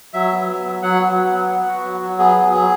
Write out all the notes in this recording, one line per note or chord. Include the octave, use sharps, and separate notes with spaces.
F#3 E5
B3
F#3
F#3
F#3 F#5
B3
F#3
B3
B3
F#4
F#3
F#3
B3 G#4
F#3
F#3